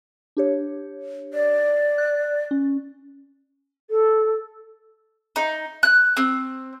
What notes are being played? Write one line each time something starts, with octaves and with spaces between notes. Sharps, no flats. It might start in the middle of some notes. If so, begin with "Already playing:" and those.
D4 G4 C#5
D5
F#6
C#4
A4
D#4
F#6
C4